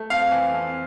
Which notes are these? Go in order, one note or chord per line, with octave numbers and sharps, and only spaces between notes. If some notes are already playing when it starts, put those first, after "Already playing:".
Already playing: A3
F2 F5
E3
F2